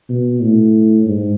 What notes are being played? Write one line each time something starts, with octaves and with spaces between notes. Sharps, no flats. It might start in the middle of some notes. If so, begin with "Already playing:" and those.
B2
A2
G#2